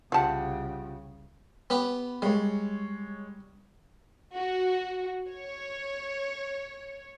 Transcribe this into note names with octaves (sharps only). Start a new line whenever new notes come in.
C2 C#3 F4 G4 E5 F#5 A5
B3 G4 B4
G3 G#3 C#5
F#4
C#5